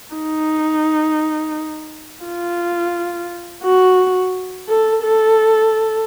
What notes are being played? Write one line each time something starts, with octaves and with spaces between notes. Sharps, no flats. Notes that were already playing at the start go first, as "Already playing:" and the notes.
D#4
F4
F#4
A4
A4